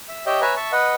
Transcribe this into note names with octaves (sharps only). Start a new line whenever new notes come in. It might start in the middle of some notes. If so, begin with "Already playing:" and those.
E5
G4 C#5 D#5 E5 G5
B4 C#5 E5 G#5 A#5
E5 A5 C#6
B4 D#5 F#5